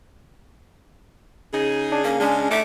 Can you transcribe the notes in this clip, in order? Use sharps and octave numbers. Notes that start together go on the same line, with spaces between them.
C#3 D#4 G#4
D4
A#3 C#4
G#3 C#4 D4
A3 D#4 E5 D6